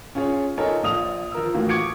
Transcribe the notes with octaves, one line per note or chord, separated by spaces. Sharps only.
C#4 F4 G#4 C#5
D#4 F4 A4 A#4 C#5 G#5
A#1 F4 D#6 F7
F3 A#4 E6
A2 E3 A#3 F4 F#4
C#6 D6 G#6 C#7 D7